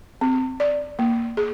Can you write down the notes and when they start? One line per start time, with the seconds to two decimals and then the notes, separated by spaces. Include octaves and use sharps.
0.21 C4
0.60 D5
0.99 A#3
1.37 G#4